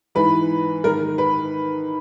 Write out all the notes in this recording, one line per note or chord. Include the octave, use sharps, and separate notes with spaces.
G#2 E3 B4
G#2 D#3 A#4
B4